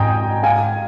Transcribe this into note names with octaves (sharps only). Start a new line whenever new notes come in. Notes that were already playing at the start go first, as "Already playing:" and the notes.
Already playing: G#2 G5 G#5 A#5 D#6
F5 G#5